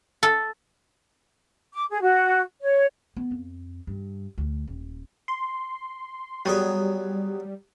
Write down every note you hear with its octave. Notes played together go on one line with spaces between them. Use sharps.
A4
D6
G#4
F#4
C#5
B3
F2
G2
D2
D#1
C6
F#3 G3 B3 G#4